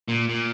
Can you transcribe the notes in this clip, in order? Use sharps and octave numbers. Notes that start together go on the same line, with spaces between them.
A#2
A#2